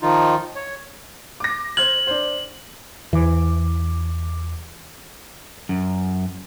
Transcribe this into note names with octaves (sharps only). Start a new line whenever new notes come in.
D#3 F3 D#4 F4
C#5
D6 A#6
C5 F6 G#6 F#7
D4 C5
E2 E3 D6
F#2